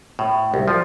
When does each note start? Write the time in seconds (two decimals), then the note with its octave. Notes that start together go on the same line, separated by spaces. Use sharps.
0.19 A2
0.54 C2
0.68 F3